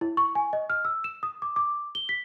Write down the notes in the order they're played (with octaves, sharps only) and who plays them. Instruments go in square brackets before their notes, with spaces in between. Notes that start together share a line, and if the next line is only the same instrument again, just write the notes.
[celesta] E4
C#6
G#5
D#5
F6
E6
E7
D#6
D6
D6
G7
B6